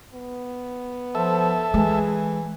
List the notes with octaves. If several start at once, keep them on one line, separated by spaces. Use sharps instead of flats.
B3
F3 A4 E5
E3 G#3 G#4